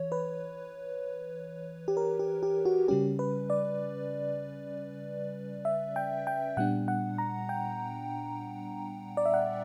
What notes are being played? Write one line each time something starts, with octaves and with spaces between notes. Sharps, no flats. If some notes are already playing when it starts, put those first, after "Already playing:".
Already playing: E3 C#5
B4
G4
A#4
G4
G4
F#4
C#3 G3 C#4 G4
B4
D5
E5
G5
G5
A#2 G3 B3 D4 F#5
F#5
A#5
G5
D5
E5
F#5